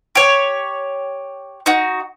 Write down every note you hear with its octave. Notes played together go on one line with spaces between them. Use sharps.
G4 C#5
D#4 F#4